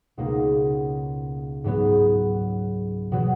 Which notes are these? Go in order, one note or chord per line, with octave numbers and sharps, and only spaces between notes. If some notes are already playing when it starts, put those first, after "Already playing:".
C#2 B2 A#3 D#4
G#2 F#3 B3
B2 F#3